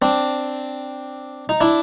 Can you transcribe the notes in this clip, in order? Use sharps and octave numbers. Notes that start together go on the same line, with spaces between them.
C4 D4
D#4
D4 E4